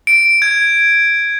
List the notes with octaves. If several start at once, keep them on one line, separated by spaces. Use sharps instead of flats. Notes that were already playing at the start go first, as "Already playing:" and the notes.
D7
G#6